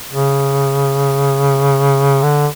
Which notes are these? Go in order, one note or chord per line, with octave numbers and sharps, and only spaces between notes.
C#3
D3